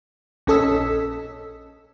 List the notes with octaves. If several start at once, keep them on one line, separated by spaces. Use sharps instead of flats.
A#1 C#4 A4 D#5 E6 B6